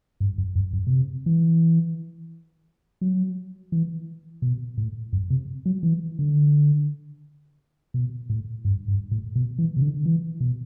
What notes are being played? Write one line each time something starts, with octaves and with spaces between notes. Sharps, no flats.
G2
F#2
F#2
F#2
B2
C3
E3
F#3
E3
B2
A2
F#2
C3
F#3
E3
D3
B2
A2
G2
G2
A2
B2
E3
C3
D3
E3
B2